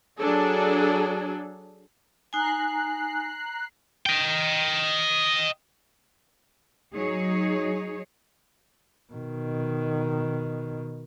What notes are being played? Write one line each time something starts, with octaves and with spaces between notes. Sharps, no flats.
F#3 D4 G#4 A4
D#4 G#5 A#5 F#6 C7
D#5 G5
F#3 D#4 G#4 C#5
B2 D#3